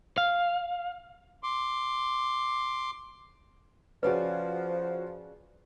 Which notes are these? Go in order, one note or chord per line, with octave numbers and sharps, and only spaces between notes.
F5
C6 D6
C#3 F3 C#4 F#4 B4 D5 G#5